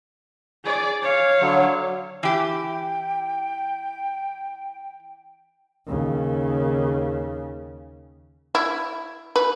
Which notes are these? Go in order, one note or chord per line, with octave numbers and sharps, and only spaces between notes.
G#4 D5
C#5 F5
D3 F#3
E3 G4 G5
D#2 C#3
E4
B4